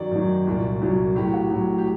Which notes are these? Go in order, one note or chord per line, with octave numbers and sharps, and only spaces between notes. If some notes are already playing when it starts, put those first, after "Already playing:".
Already playing: F#2 D#3 F#3 D5
F#2 D#3 F#3
C2 A#2 F#3
C2 A#2 F#3
A2 F#3 G4
F#4
A2 F#3
G4